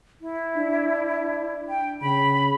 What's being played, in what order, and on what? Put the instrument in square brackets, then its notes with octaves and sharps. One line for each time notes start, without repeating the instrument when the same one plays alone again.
[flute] E4
[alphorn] D4
[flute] G5
[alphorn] C#3 [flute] B5